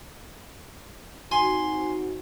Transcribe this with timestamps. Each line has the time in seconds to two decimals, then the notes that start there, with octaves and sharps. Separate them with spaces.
1.31 C4 D#4 F#4 G#5 C6